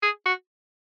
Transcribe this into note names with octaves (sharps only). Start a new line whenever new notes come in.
G#4
F#4